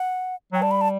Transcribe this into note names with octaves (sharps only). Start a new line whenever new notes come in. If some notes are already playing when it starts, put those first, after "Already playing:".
Already playing: F#5
F#3 G5
G3 A5
B5
A5